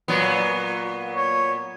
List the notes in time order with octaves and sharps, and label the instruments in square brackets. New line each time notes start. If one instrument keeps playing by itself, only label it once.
[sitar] A#2 F#3 B3
[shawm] C#5